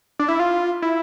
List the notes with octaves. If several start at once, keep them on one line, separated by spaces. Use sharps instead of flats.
D4
E4
F4
E4